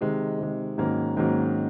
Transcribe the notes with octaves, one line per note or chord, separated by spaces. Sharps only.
C3 D#3 G#3
C3 D#3 G#3
G#2 D#3 F#3 A#3 C#4
G#2 D#3 F#3 A#3 C#4